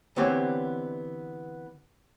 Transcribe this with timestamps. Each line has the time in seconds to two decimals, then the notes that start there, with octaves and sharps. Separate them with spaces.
0.16 D3 E3 B3 C4 G4 C#5